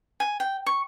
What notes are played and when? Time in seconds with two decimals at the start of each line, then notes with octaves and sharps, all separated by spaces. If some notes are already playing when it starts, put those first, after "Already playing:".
0.20 G#5
0.40 G5
0.66 C#6